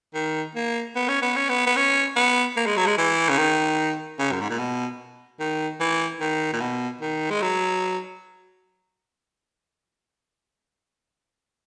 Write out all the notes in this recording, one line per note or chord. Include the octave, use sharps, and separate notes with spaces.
D#3
A#3
B3
C#4
B3
C#4
B3
B3
C#4
B3
A#3
G#3
F#3
G#3
E3
C#3
D#3
C#3
F#2
G#2
A#2
B2
D#3
E3
D#3
A#2
B2
D#3
G#3
F#3